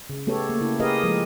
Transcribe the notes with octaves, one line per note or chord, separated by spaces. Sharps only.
C#3
A3 B3 G4 A4 C#5
A#3
C#3 E4
G4 G#4 A#4 B4 D#5 F5
F3 G#3 A#4